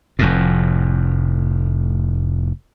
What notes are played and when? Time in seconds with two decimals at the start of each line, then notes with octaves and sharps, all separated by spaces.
0.19 F1 F2 A2